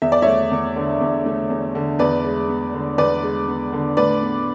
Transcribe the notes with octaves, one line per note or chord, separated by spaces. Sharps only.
E2 E5
D5
A3 C#5 E5
E2
D3
E2
A3
E2
D3
E2 B4 D5
G#3
B3
D3
E2 B4 D5
G#3
B3
D3
A2 B4 D5
B3